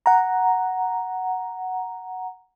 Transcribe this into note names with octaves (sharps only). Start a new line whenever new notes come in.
F#5 A#5